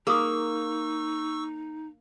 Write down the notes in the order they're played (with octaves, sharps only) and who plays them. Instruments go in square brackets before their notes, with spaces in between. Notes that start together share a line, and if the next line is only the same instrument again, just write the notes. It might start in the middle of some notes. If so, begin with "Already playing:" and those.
[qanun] A#3 [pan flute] D#4 [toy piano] G#4 D#6 [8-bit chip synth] C#6 E6